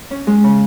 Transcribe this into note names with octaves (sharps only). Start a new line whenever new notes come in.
C#4
G#3
C#3